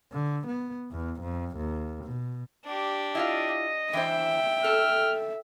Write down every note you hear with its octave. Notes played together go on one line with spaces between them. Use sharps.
D3
B3
E2
F2
D#2
B2
D4 G4
E4 F4 D#5 F5
E3 D4 C5 E5 G5
A4 F6